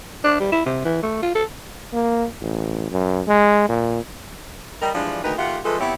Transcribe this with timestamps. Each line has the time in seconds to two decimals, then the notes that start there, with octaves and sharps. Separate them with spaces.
0.24 D4
0.40 G3
0.52 E4
0.66 C3
0.85 E3
1.03 A3
1.22 F4
1.35 A4
1.93 A#3
2.41 A1
2.91 F#2
3.27 G#3
3.69 A#2
4.82 G3 A#4 D#5
4.95 E3 F3 G3 G#3 D4
5.24 D2 D#3 D#4 A#4 B4
5.38 D#3 A3 F4 G4 F#5
5.64 F3 G#3 A3 F4 A4 B4
5.80 B3 C4 E4 G4 C#5